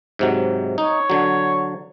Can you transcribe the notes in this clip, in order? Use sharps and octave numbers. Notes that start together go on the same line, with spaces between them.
G#2 C3 F#3
D#4 C#5
D3 F#3